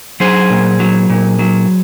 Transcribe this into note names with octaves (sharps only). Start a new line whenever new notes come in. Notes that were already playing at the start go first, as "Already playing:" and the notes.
F#3 G#4 C5
A#2
F#3
A#2
F#3